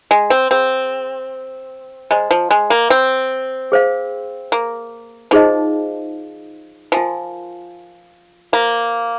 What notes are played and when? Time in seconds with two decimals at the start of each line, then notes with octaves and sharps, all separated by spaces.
0.11 G#3
0.30 C4
0.50 C4 G#4 F5 A#5
2.11 G#3 C5 D#5 A#5
2.31 F3
2.50 G#3
2.70 A#3
2.90 C4
3.72 G#4 C5 F5
4.52 A#3
5.31 F3 D#4 G#4 C5 D#5
6.92 F3 F4 A#4 G#5 C6
8.52 A#3 F4 C5 F5 C6